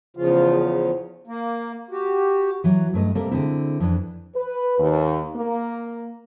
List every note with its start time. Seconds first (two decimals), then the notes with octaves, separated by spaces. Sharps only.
0.17 E2 C#3 F3 F4
1.27 A#3
1.90 F#4 G4
2.64 E3 F#3
2.93 G2 A3 B4 D#5
3.15 C3 G3 A#3 A4 A#4
3.31 D3 G#3 C4 E4
3.80 F2 E3 D4
4.35 B4
4.78 D#2
5.35 A#3